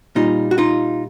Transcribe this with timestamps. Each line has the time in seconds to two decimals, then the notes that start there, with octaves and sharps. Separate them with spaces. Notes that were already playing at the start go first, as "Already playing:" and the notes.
0.15 A#2 G3 D#4 F4
0.51 F#4
0.58 D#4 F4